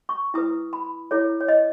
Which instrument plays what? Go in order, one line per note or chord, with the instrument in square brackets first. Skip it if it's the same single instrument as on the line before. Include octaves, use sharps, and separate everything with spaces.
[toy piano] C#6
E4 B4 D#6
B5
E4 A4 C#5
C#5
D#5